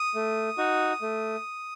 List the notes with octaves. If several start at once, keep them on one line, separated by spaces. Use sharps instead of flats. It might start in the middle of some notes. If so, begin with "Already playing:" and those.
Already playing: D#6
A3
D#4 F#4
A3